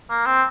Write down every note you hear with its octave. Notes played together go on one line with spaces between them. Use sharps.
A#3
C4